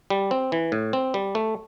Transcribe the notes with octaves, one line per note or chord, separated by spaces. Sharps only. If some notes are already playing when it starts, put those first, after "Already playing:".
G3
C4
E3
A2
C4
G3
A3